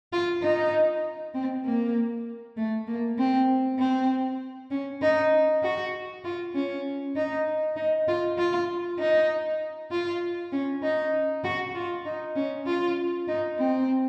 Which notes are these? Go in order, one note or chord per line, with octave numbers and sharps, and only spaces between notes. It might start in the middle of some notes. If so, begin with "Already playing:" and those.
F4
D#4
C4
A#3
A3
A#3
C4
C4
C#4
D#4
F#4
F4
C#4
D#4
D#4
F4
F4
D#4
F4
C#4
D#4
F#4
F4
D#4
C#4
F4
D#4
C4